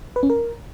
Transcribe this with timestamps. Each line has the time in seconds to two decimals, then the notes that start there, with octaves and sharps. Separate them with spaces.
0.16 B4
0.23 C#4
0.30 A#4